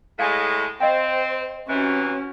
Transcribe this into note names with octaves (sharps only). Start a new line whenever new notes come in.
A2 G#3 F5 G#5
C4 C5 D#5 F5 G5
C3 E3 C#4 F#4